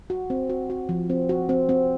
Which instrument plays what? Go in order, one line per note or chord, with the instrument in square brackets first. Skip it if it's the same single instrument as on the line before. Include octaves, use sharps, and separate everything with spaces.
[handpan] F#4
C4
F#4
F#4
F3
C4
F#4
C4
C4